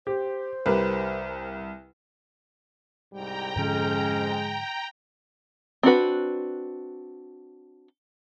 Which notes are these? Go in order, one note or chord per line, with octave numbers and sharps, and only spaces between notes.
G4 C5
C2 G4 A#4 B4
C2 G#2 G3 G5 A#5
F2 G#2 D3 F3 G#3 C#4
C4 D4 F#4 B4